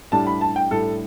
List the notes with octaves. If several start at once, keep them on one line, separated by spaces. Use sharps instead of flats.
A2 G3 D4 A5
B5
A5
G5
A2 G3 D4 A4